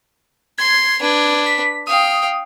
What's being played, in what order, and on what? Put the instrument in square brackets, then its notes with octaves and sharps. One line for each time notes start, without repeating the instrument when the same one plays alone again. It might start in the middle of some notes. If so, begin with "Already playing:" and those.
[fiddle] C6 [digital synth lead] G#6
[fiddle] D4 B4
[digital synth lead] B6
[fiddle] F5 G5 [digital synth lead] D#6